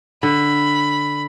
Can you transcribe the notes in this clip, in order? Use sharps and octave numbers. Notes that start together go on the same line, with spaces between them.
D3 B5